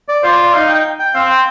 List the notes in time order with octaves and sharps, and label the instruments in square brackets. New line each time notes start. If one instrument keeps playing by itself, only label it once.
[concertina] D5
[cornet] F4 [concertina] C5
[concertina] D5
D5
[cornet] D#4 [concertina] F5
[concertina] G5
G5
[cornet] C4 [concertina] F5
[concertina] G5